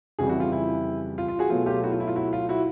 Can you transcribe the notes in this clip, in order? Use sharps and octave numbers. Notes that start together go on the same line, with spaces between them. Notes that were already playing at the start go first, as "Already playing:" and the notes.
F2 C#3 E3 G3 F#4 G#4
E4 F#4
F4
E4
F4
F4
F#4 G#4
B2 F#3 A3 F4
F4 G4
E4 F#4
F4
E4
F4
E4 F#4
F4
E4 F#4